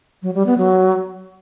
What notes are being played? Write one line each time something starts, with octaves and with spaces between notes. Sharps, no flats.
F#3
G3
B3
F#3